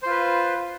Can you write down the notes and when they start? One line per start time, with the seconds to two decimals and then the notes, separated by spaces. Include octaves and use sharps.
0.03 C5
0.06 F4
0.10 B4